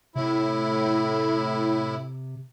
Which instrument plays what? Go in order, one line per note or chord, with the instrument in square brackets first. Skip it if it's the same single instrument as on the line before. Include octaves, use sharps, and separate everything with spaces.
[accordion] A2 E4 [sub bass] C3